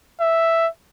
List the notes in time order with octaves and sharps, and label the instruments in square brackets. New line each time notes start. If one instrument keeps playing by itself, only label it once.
[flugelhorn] E5